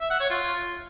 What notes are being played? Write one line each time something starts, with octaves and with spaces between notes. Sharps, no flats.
E5
F#5
C#5
F4